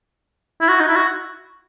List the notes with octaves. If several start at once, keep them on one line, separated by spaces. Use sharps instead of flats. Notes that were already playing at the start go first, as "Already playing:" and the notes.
E4
F#4
D#4
E4
F#4